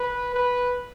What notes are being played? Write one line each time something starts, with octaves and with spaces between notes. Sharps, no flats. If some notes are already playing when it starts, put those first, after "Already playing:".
Already playing: B4
B4